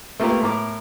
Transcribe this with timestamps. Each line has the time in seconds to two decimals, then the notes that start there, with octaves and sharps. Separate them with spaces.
0.20 A3 A#3 F4 G4 A#4 B4
0.42 A2 A#4 D6